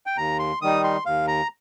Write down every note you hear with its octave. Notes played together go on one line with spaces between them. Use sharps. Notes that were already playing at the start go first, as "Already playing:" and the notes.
G5
D#2 A#5
C6
D#3 G3 D#4 D#6
C6
D#2 F5
A#5